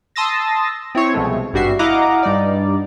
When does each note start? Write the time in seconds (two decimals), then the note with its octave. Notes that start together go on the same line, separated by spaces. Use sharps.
0.16 A5 C6 D#6 E6 A6 A#6
0.95 C4 E4 C#5
1.14 C2 B2 F3 G#3 A3
1.53 G#1 G2 G3 F#4 E5 C7
1.79 E4 D#5 F5 F#5 A#5 D6
2.23 G2 G3 D#4 D5